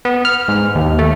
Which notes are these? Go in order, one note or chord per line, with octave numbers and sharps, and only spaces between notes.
B3
F6
G#2
D#2
A3